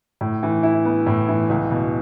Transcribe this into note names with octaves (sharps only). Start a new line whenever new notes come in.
A2
E3
E4
B3
A2
E3
C#2
B2